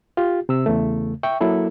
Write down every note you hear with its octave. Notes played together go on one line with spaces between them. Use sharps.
F4 G4
C3 E6
E2 C#3 A3
E5 G5 C#6
F#3 A#3 E4 A4